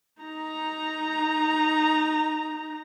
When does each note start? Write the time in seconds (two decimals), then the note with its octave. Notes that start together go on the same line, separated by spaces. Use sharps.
0.22 D#4 A#5